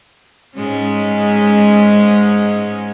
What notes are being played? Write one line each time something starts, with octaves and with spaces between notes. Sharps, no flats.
G#2 G#3 C#4